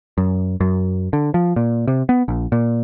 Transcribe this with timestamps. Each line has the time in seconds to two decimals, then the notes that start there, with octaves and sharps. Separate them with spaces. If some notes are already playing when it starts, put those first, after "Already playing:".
0.18 F#2
0.60 F#2
1.13 D3
1.34 F3
1.56 A#2
1.88 C3
2.09 B3
2.28 A#1
2.52 A#2